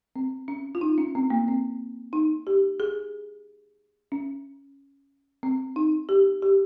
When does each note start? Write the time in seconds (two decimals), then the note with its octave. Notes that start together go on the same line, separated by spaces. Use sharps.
0.16 C4
0.48 C#4
0.75 F4
0.81 D#4
0.98 C#4
1.15 C4
1.30 A#3
1.48 C4
2.13 D#4
2.47 G4
2.80 G#4
4.12 C#4
5.43 C4
5.76 D#4
6.09 G4
6.42 G4